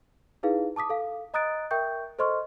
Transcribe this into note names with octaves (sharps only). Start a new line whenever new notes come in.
D#4 E4 G#4 B4 F5
A5 D6 D#6 B6
A4 F5
D#5 A#5 D#6 F#6 A6 D7
A#4 E5 G5 C#6 G6
A4 C5 D#5 C6 C#6 F6